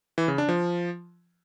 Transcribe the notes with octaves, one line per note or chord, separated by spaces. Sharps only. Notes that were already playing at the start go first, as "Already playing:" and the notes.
E3
C#3
D4
F3